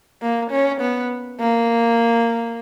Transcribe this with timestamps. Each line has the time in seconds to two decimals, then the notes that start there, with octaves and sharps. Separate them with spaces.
0.22 A#3
0.51 C#4
0.81 B3
1.40 A#3